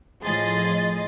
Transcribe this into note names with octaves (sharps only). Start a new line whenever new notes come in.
A2 F3 G#4 D#5 C6 A6